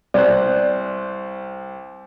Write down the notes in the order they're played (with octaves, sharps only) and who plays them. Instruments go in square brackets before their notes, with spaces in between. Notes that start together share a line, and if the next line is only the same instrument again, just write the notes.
[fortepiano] C2 C5 F#6 [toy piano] D5